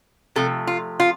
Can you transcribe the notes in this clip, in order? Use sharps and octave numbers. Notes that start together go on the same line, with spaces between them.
C3 F3 A3 A4
F4
F4